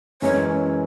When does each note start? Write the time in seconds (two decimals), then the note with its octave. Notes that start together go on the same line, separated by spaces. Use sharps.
0.22 F#2 E3 G#3 C#4 C#5